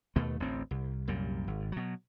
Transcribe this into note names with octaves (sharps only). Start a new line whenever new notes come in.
D#2 B2 A3
A1 D2 C4
C2
C2 F#2 A#2 G3
G#1
B2 F#3